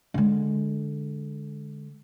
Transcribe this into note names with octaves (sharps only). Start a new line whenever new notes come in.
D3 G#3